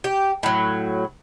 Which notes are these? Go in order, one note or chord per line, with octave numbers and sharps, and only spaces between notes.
G4
A2 F#3